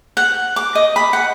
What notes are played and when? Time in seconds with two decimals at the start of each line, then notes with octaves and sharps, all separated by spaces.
0.17 F#5
0.56 D6
0.75 D#5
0.96 B5
1.13 F#5